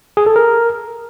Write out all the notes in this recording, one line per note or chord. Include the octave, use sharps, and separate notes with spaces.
G#4
A4
A#4